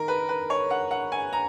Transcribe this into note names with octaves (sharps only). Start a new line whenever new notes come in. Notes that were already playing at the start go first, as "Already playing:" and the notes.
Already playing: D#3 A#4
B4
B4
C#5
F#5
F#5
G#5
A#5